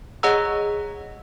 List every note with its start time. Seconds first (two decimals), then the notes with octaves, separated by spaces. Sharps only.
0.23 G#4 C#5 D#5 F#5 A#5 E6